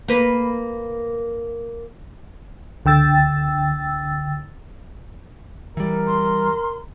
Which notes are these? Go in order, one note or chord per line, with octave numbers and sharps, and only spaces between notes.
A#3 B4
C#2 D3 G5 E6 A6
E3 G3 A#4
C6